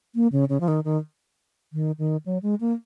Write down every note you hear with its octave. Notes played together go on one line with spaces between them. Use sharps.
A#3
C#3
C#3
F3
D#3
D#3
D#3
D#3
F#3
G#3
A#3